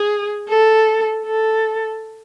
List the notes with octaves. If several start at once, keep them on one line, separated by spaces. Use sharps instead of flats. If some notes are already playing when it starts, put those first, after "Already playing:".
Already playing: G#4
A4
A4